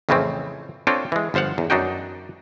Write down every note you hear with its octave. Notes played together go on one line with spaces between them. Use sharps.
F2 A2 C#3 E3 A3 C4
C4 D4 F4 A4 C#5 G5
E3 G#3
G1 F3 C5 F5 F#5
E2
F#2 D4 D#4 F#4 G5